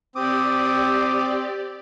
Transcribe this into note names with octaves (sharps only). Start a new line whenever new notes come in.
C4 G4 D5 D6 D#6